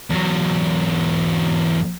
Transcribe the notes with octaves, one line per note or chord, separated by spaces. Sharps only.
E2 F#3